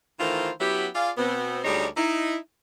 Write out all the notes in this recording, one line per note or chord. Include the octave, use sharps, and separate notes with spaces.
D#3 E3 A3 F4 A#4 C5
F#3 B3 C#4 E4 G4
F4 G#4 D5 F5
B2 B3 C4
D2 G3 G#3 D#4 C#5 D5
D#4 E4